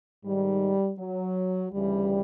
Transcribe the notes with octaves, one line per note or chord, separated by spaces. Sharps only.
G#2 D#3 G3
F#3
D2 C#3 E3 G3